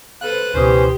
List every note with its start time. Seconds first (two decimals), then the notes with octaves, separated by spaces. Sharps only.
0.21 A4 B4 C5 F5 F#6
0.54 C#2 B2 E3 C#4 G4 C5 D#6